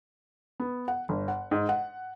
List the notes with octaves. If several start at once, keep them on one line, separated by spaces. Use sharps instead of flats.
B3
F#5
G1
F#5
G#2
F#5